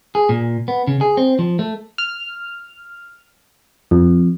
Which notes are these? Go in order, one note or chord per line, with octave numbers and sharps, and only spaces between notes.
G#4
A#2
B3
C#3
G#4
C4
F3
A3
F6
F2